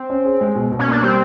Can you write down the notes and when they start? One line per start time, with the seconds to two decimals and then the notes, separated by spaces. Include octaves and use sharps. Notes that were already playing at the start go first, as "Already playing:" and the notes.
Already playing: C4
0.10 C#4
0.25 G#4
0.41 G#3
0.55 B2
0.71 B2
0.79 C#4
0.88 A#3 D4
1.03 G3 C4